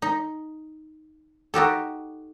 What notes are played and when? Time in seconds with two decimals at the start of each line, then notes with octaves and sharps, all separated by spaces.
0.02 D#4
1.54 D#4 F#4 G4 A4